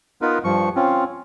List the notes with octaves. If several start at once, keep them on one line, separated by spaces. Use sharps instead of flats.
B3 D#4 F4 A#4 B4
G2 F3 C#6
C4 C#4 F4